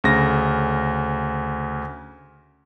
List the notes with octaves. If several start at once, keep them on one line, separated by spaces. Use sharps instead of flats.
D2 C#3 A#6